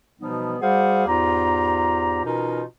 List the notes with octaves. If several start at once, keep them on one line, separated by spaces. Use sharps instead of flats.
B2 E3 F3 G3 B3 D#4
G3 F#4 G#4 C5 F5 F#5
E2 G#2 F4 G4 A#5
B2 E3 C#4 D#4 F4 A#4